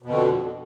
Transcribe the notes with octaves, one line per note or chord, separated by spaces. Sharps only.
F2 B2 D3